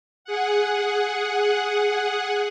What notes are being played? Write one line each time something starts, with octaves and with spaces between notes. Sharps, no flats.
G#4 F#5